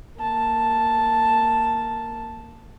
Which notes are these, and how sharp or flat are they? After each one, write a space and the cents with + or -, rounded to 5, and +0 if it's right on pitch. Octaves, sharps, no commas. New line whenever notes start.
A#3 -10 A5 +0